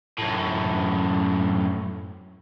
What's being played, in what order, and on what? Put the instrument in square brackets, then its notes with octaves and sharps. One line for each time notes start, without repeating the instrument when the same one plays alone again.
[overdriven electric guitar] F#2 A2